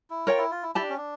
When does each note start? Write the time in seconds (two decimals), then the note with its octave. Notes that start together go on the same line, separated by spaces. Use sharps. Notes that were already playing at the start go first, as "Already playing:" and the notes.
0.10 E4
0.27 F4 A#4 C#5 G5
0.38 E4
0.51 F4
0.63 E4
0.75 E4 G4 D5 A5
0.82 D4
0.90 C#4
0.97 D4